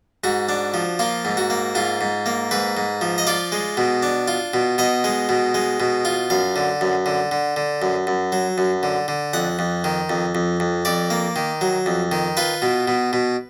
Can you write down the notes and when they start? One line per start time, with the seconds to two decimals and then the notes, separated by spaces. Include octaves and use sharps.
0.24 G#2 F#4
0.49 D4
0.74 F3
0.99 A#3 F4
1.25 G#2
1.37 F#4
1.50 A#3
1.75 G#2 F4
2.01 G#2
2.26 A#3
2.51 G#2 B4
2.77 G#2
3.01 F3
3.18 D#5
3.27 F4 D5
3.52 G#3
3.77 B2
4.03 D4
4.28 F4
4.54 B2
4.78 B2 D#5
5.04 G#3
5.29 B2
5.54 G#3
5.80 B2
6.05 F4
6.30 F#2 F5
6.56 D3
6.81 F#2
7.06 D3
7.31 D3
7.56 D3
7.82 F#2
8.07 F#2
8.32 F#3
8.58 F#2
8.83 D3
9.08 D3
9.34 F2 F#5
9.59 F2
9.84 D#3
10.10 F2
10.35 F2
10.60 F2
10.85 F2 D5
11.10 A#3
11.36 D#3
11.61 F#3
11.86 F2
12.12 D#3
12.37 F4 B4
12.62 B2
12.88 B2
13.13 B2